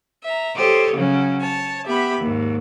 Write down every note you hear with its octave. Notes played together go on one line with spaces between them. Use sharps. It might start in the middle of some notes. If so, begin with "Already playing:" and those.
E5 A#5
G4 A4 C5 C#5 D#5
C#3 F#3 C#4
C#5 A5
B3 G4 E5 B5
D#2 G#2